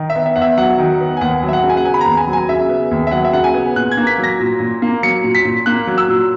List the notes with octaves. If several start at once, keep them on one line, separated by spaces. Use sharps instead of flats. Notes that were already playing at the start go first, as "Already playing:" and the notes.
Already playing: D#3
E5
B3
E5
E2 F#5
E5
F#3 F#5
D#3
B3
G#5
D#2 F#5
F#3
E5
F#5
C#3
G#5
F#5
B3 G#5
B5
A#5
D#2
G#5
F#3
G#5
C#3 E5
B3
D#2
E5
F#3 F#5
E5
C#3 F#5
G#5
B3
A#2 F#6
G#6
A#3
B6
F#3
A#6
A#2
A#2
A#3
F#3 C#7
A#2
B6
A#2
A#3 F#6
F#3
E6
A#2